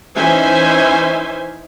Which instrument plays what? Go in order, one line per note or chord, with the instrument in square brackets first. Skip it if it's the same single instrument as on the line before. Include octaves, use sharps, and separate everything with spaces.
[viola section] E3 C#4 D#4 C5 E5 G#5